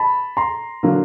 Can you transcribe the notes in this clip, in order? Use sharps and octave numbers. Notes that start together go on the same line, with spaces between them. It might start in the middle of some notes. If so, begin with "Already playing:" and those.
Already playing: A5 B5
A#5 C6
D3 F#3 A#3